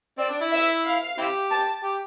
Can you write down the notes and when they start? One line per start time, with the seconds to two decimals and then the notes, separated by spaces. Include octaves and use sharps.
0.18 C4 D5
0.29 D4
0.41 E4
0.51 E5
0.85 F5
1.18 C4 E4 G4
1.51 A5
1.84 G4